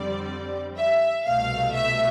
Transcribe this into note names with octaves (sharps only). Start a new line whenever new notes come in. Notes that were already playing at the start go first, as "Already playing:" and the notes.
Already playing: F2 D3 G3 C4 D5
E5
C2 B2 A3 F5
E5